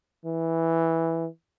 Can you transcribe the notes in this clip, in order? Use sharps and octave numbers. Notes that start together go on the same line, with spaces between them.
E3